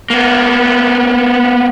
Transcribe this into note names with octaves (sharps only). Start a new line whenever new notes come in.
A#3 B3